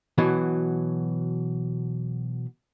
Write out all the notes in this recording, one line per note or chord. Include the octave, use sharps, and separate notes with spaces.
B2 E3 F#3